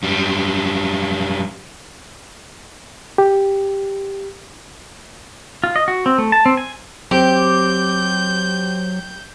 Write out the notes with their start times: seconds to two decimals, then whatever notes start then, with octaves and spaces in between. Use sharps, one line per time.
0.03 F#2 G3
3.18 G4
5.64 F4
5.76 D#5
5.88 F#4
6.06 C4
6.18 A3
6.32 A5
6.46 C4
6.57 G#5
7.11 F#3 C4 G4 G6